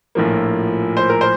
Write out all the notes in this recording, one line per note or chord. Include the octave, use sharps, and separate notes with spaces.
A#1 A2 F3 A#3
C5
A#4
C5